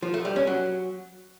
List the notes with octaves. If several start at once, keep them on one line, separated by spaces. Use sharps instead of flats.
F3
A3
G3
C#4
F#3